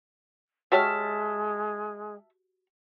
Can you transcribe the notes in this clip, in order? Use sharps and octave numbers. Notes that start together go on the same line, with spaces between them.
G#3 F#4 G4 C#5 E5 A5 F6